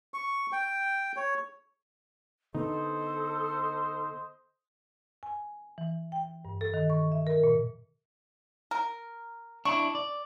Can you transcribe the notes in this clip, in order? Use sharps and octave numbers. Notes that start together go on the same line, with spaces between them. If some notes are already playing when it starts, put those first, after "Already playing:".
C#6
G5
C#5
D3 B3 D#4 A4 C5 D#5
G#5
E3
G5
G2
A4
D#3
C#6
E5
A#4
A#2
A#4
D4 E4 C#6
D5